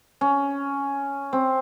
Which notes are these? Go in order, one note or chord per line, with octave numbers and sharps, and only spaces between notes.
C#4
C4